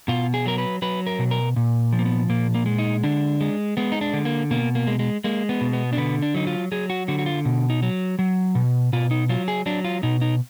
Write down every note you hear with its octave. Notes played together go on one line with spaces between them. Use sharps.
B2 F4
G#4
F#3 A#4
B4
F#3 B4
A#4
B2
A#4
A#2
F3
A#3
B3
A#2 A#3
A#3
G#3
D#4
D3 D4
G#3
G#3 B3
D#4
D4
D3
A#3
B2 A#3
A#3
G#3
G#3
G#3 A#3
B3
B2
B3
D4
D3 B3
D4
F#3 D#4
F4
F#3 G#4
F#4
D3 F#4
F#4
F4
B2
D#4
F#3
F#3
B2
B2 F4
D#4
F#3 F4
G#4
F#3 D4
F4
B2 D#4
D#4